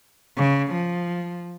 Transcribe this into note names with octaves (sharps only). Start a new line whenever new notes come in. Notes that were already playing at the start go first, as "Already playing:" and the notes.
C#3
F3